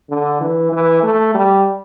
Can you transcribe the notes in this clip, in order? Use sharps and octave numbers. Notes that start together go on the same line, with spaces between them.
D3
E3
E3
A3
G3